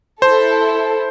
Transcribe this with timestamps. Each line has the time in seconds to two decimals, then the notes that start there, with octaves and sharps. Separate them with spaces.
0.22 E4 A4 C5